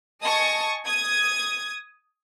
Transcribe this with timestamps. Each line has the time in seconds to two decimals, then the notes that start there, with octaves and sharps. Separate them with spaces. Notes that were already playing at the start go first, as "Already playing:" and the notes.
0.23 D#5 G#5 A5 C#6 D#6
0.86 D#6 G#6